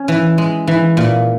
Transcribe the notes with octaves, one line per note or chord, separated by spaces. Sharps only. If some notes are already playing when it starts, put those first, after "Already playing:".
Already playing: C#4
E3
G#3
E3
A#2